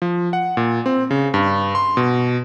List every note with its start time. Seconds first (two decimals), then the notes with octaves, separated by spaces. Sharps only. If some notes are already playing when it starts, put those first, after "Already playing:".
0.02 F3
0.33 F#5
0.57 A#2
0.86 C4
1.11 C#3
1.34 G2
1.75 C6
1.97 B2